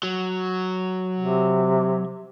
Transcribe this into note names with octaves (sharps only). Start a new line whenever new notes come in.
F#3
C3